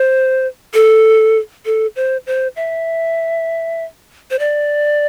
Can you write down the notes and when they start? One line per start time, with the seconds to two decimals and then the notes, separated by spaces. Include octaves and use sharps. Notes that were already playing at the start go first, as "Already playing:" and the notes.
Already playing: C5
0.74 A4
1.66 A4
1.96 C5
2.27 C5
2.56 E5
4.31 C5
4.39 D5